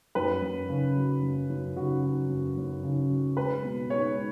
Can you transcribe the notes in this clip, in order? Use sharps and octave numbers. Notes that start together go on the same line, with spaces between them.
F#2 B4
F#2
C#3
F#3
F#2
F#2
C#3 F#4
F#3
F#2
F#2
C#3
F#3
G#3 B4
B2
G#3 C#5